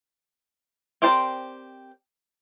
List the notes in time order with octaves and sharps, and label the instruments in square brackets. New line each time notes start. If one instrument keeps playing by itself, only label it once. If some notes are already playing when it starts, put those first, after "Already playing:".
[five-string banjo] C4 G4 A#4 C5 D5